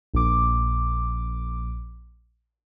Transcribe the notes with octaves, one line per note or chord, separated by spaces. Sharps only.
A#1 D6